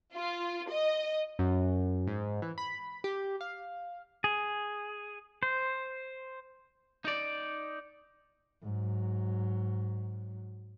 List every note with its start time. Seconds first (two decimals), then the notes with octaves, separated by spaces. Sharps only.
0.14 F4
0.69 D#5
1.39 F#2
2.07 G#2
2.42 E3
2.58 B5
3.04 G4
3.41 F5
4.24 G#4
5.43 C5
7.05 D#4 D5
8.62 G#2 F#3